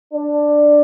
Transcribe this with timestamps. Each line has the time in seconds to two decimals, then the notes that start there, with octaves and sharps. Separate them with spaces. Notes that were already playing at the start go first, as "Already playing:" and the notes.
0.14 D4